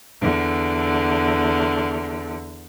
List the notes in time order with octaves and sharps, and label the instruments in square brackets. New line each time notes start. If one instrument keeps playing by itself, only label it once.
[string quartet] E2 D3